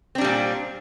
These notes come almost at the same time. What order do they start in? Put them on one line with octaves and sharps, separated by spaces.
C4 D4 G3 A#2